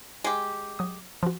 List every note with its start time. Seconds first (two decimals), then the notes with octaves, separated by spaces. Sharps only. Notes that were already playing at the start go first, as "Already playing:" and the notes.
0.24 G#3 G4
0.79 F#3 D#6
1.23 F3 F#4